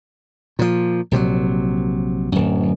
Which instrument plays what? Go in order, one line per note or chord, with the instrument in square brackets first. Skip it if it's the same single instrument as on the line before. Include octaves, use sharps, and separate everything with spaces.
[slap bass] A#2 F3
A#1 C3 E3 F#3
D1 F#2